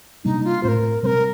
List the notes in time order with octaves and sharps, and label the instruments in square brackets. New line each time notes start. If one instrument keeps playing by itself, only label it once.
[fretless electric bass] C3 G3 A#3 D4 [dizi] D#4
[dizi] F4
[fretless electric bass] A2 A3 C4 [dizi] A#4 C5
[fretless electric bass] C3 G3 C4 [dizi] A#4 C5